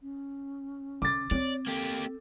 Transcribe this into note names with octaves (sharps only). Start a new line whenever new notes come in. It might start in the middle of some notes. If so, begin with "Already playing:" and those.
C#4
D3 D6 A6
C4 C#5 D5
A#3 G4 A4